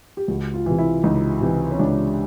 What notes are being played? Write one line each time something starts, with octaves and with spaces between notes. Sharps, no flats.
G4
C#2 F#4
F4
C3 E3
E4
C#2 D#4
C3 E3
C#4
C#2 D4